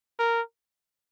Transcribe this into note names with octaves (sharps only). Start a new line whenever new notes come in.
A#4